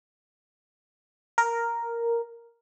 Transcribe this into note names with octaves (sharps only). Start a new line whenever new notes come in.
A#4